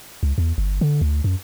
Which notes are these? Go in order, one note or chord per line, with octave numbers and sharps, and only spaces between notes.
C#2
E2
G1
D3
D2
F#2